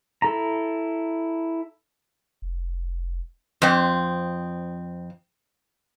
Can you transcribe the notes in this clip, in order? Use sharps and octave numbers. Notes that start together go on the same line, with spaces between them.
E4 A4 A#5
F1
F2 C4